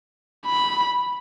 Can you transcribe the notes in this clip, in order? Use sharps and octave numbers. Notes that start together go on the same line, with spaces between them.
B5